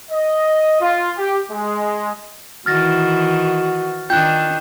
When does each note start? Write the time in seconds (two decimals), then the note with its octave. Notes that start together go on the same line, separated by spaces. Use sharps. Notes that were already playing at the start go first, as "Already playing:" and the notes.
0.11 D#5
0.81 F4
1.17 G4
1.51 G#3
2.66 D#3 E3 F#4 F6 A6 A#6
4.10 D#3 D4 F4 G5 F#6 G6